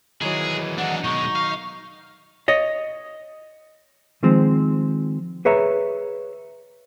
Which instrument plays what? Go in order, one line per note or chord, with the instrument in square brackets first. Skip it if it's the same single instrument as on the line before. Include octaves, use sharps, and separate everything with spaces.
[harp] D#3 F#3 [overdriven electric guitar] E3 G#3 [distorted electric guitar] G#4
[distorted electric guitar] D4 D#4 [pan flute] F#5
[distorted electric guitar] B2 G#3 [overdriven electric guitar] D#4 [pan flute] C#6
[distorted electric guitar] F5
[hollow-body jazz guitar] C#5 D#5
D#3 F3 G#3 C4
G#4 B4 C#5 E5 A#5